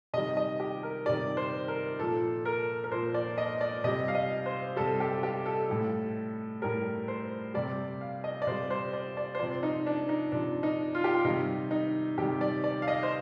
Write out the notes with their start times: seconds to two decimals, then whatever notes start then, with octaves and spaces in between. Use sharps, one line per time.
0.13 C3 D#3 G3 D#5
0.37 D#5
0.60 G4
0.83 A#4
1.06 C3 D#3 G3 D5
1.37 C5
1.68 A#4
1.99 A#2 F3 A4
2.45 A#4
2.84 A#4
2.91 A#2 F3 C5
3.14 D5
3.38 D#5
3.61 D5
3.84 C3 G3 D#5
4.08 F5
4.15 D#5
4.46 C5
4.76 C3 G3 A4
5.00 G4
5.23 G4
5.46 A4
5.69 A2 G3
6.62 A2 G3 A#4
7.08 C5
7.54 C3 G3 D5
8.01 F5
8.24 D#5
8.42 D5
8.47 C3 G3 C5
8.70 C5
8.93 D5
9.17 D5
9.35 C5
9.39 C3 F3 D5
9.63 D#4
9.86 D4
10.09 D#4
10.32 C3 F3 D4
10.63 D#4
10.95 F4
11.04 G4
11.14 F4
11.25 C3 D#3 G3 D#4
11.71 D#4
12.18 C3 D#3 G3 G4
12.41 D5
12.64 D5
12.82 F5
12.88 D#5
13.03 C5